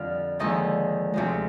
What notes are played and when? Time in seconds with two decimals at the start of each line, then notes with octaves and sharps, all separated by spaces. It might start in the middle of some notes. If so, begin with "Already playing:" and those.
Already playing: F2 D3 G3 F5
0.39 D#2 D3 F3 G#3 D#5
1.14 D2 C3 F3 G#3